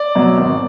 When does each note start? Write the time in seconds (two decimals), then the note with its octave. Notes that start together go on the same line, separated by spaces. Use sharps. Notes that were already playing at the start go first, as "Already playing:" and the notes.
Already playing: D5
0.15 B2 F#3
0.38 G#1